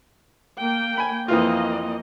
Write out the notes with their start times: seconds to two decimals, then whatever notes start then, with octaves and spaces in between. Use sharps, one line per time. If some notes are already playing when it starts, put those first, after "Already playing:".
0.59 A#3 G5
0.97 G#5 B5
1.28 F2 E3 A#3 F4 D#5